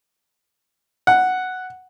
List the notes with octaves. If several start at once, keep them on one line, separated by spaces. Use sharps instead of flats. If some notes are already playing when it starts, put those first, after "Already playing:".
F#5